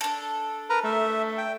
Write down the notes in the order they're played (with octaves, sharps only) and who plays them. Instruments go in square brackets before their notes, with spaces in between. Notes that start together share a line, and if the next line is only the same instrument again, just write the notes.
[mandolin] D4 A4
[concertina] A#4 B4 A#5
[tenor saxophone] A3 [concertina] E5
[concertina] G5